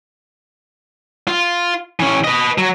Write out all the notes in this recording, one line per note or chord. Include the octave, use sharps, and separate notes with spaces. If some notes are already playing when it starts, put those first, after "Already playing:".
F4
E3 C#4
B4 D#5
F#3